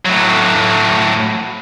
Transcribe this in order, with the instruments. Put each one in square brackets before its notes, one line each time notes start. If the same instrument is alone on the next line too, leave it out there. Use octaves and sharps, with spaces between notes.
[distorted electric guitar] A2 F#3